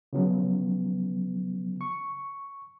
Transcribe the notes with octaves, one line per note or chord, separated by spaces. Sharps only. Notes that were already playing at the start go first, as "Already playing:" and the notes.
C#3 F3 F#3 B3
C#6